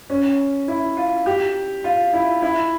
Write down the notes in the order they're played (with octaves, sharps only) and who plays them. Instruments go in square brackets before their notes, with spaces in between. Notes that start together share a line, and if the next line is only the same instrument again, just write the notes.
[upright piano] C#4
E4
F4
G4
F4
E4
E4